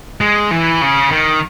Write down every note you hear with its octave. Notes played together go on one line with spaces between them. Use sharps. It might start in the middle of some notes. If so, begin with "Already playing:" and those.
G#3
E3
C#3
D#3